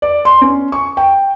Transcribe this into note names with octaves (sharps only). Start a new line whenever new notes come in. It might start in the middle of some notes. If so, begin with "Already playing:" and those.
D5
C6
C#4
C#6
G5